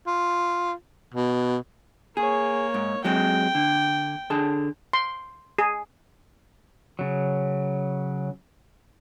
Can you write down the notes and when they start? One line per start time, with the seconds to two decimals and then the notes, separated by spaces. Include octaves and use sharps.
0.07 F4
1.14 B2
2.17 A#3 G#4 C#5
2.74 G#2
3.04 F#3 G#3 C4 G5
3.55 D3
4.30 D3 G#4 A5
4.93 C6
5.58 G#4
6.99 C#3 F#3